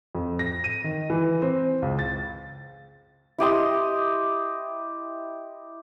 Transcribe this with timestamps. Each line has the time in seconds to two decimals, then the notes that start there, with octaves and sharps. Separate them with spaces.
0.15 F2
0.39 A#6
0.64 D#7
0.84 D#3
1.10 E3
1.42 C4
1.82 C#2
1.99 A6
3.38 E4 G4 D#5 C6